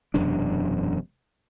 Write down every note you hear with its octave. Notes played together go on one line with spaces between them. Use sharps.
E1 F#2 C3 D4